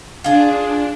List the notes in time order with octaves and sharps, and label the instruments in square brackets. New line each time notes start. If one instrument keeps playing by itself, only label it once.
[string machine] D4 [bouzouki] F4 G#4